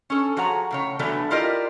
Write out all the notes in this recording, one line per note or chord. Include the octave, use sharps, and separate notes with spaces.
C#4 A4
F3 F#4 G#4 C#5 F#5 A#5
A2 C#3 C#5
D3 E3 F#3 G3 A3 B3
E4 F4 G4 A#4 D5 D#5